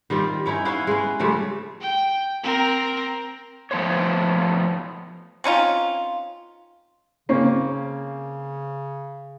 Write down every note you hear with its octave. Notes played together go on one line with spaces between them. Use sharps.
D#3 G3 C4 F4
C#4 D#4 E4 C#5
B3 C#4 E4 F5
G#3 B3
C#3 F3 G3 A3
G5
C4 A#4
F3 A3 B3 C5 C#5
C4 C#4 D#4 F4
C#3 A#3 C4 C#4